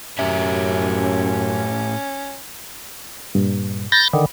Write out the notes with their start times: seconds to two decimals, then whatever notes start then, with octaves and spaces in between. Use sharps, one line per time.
0.19 F#2 A2 C#4 G4 E5
3.35 G2 A#2
3.92 B5 G6 A6 A#6
4.13 D3 D#3